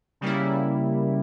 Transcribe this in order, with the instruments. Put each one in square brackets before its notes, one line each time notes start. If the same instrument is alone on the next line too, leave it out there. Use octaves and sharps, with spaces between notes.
[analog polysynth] C#3 G3 A#3 E4